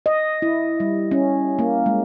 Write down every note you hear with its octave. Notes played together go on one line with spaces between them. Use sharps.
D#5
E4
G3
C#4
A#3
G#3